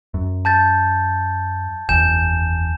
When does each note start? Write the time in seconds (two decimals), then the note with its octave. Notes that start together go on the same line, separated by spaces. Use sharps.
0.14 F#2
0.45 A5 G6 A6
1.89 F#1 E2 G#5 G6 E7